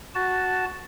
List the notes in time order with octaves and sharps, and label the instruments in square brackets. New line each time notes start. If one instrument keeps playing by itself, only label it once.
[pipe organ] F#4 A5